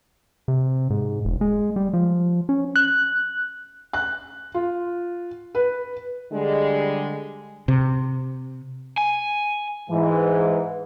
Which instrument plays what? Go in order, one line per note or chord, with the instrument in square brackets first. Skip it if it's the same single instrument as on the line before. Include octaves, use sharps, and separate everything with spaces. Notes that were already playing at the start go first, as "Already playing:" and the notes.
[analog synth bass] C3
G#2
E1
G#3
G3
F3
C#4
[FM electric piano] F#6
[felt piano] F#6
F4
B4
[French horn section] D3 G3 G#3
[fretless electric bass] C3
[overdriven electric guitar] G#5
[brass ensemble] G#2 E3